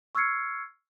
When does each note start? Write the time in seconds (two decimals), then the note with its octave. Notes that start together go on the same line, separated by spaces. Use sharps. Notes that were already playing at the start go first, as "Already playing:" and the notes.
0.15 C#6 E6 F6 G#6 C7 C#7